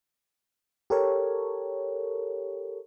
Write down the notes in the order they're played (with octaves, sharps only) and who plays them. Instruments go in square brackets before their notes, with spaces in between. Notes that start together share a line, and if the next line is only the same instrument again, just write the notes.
[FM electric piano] G4 A4 A#4 C#5